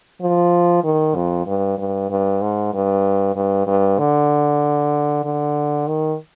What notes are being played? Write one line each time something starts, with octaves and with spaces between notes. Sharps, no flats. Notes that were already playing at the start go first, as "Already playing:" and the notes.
F3
D#3
F2
G2
G2
G2
G#2
G2
G2
G2
D3
D3
D#3